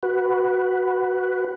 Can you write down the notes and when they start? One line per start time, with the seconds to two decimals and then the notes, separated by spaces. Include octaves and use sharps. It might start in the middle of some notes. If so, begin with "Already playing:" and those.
0.03 F#4 B4